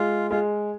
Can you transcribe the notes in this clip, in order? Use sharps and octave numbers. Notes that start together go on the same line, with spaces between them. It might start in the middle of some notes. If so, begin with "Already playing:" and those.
Already playing: G#3 F4
G#3 F4